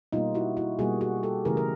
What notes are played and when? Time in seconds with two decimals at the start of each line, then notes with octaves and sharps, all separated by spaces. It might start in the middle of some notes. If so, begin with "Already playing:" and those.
0.13 B2 G3 A#3 D#4 F4
0.35 E4 F#4
0.57 E4 F#4
0.79 B2 G3 A#3 F#4 G#4
1.01 F#4 G#4
1.23 G4 A4
1.45 C#3 E3 A3 G#4 A#4
1.57 A#4